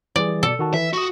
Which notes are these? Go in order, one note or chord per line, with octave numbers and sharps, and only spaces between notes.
E3 G3 G#4 D5
B2 A4 D5
D#3 F#4 A5
E3 E5
F#4 C#6 D#6